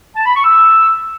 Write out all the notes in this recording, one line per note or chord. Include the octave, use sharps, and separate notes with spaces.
A5
B5
C#6
E6